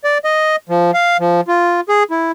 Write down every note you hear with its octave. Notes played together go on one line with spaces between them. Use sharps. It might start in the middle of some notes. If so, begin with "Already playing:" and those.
D5
D#5
F3
F5
F3
F4
G#4
E4